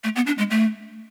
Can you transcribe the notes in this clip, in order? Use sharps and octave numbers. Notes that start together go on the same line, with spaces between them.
A3
B3
D4
G#3
A3